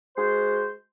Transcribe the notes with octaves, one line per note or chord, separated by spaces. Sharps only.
G#3 F#4 C5